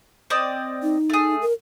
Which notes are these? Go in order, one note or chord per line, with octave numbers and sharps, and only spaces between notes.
C4 D5 D#5
D#4
A3 G#4
A#4